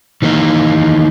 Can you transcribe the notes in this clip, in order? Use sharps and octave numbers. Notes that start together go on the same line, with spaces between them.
D#3 E3 A#3 D#4